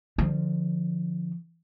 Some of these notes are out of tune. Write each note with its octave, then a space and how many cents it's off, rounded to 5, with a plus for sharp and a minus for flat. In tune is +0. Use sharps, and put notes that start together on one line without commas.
D3 +20 F3 +0